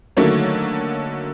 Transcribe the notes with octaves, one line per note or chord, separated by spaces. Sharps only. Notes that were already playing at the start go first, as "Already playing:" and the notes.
D3 D#3 F#3 A3 A#3 C#5